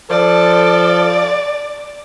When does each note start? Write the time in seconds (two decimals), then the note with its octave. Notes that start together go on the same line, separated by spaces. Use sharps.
0.10 F3 A4 D5